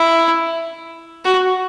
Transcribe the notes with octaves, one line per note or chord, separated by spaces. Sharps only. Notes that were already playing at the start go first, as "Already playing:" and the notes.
Already playing: E4
F#4